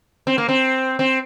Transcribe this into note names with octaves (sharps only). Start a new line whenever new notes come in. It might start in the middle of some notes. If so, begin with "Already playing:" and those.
C4
A#3
C4
C4